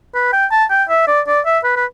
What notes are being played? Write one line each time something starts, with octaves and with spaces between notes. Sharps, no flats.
B4
G5
A5
G5
E5
D5
D5
E5
B4
B4